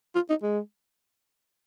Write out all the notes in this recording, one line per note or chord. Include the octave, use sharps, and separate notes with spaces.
F4
D#4
G#3